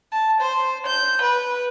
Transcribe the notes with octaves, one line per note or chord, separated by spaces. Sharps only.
A5
C5
G6
B4